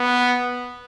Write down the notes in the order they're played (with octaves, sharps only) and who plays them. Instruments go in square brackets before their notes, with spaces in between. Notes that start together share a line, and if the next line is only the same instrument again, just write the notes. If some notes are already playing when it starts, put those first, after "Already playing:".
Already playing: [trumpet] B3